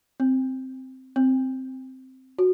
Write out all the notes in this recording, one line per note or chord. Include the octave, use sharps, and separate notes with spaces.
C4
C4
F#4